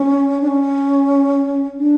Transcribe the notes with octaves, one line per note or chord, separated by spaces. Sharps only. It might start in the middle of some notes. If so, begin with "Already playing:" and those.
Already playing: C#4
D4
C#4
D4